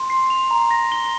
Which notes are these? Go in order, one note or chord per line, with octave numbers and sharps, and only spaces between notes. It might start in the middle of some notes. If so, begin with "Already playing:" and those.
Already playing: C6
C7
F7
A#5
A#6
G7